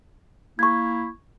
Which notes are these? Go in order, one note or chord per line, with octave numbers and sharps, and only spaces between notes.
A#3 E4 C#6 G#6